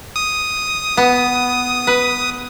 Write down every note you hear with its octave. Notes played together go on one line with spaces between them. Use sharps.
D#6
B3
B4